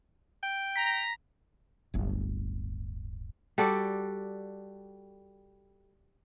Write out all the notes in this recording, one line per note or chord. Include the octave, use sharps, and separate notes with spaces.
G5
A#5 B6
D1 G1
G3 F#4 A4 D5